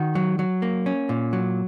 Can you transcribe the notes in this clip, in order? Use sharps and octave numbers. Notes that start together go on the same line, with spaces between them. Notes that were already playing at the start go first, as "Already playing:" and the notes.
Already playing: D#3 F#4
F#3
F#3
A#3
C#4
A#2
F#3